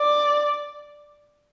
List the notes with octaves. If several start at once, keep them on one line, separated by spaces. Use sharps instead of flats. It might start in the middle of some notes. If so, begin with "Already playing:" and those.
Already playing: D5